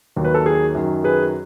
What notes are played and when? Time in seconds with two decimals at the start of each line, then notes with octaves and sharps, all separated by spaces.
0.16 D#2 D#3 F#3
0.25 B4
0.34 A4
0.46 G#4
0.75 F#2 D#3 F#3
1.04 G#4 B4